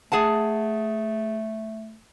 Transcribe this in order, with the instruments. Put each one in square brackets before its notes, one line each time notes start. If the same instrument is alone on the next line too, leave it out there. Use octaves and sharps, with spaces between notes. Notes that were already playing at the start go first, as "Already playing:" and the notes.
[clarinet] A3 [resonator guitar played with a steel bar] G#4 F#5 A5